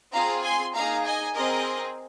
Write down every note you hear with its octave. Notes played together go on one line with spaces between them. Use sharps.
C4 F4 G#4 F5 A#5
G#5 C6
A#3 D#4 G#4 F5 A#5
D#5 G#5
C4 G#4 A#4 D#5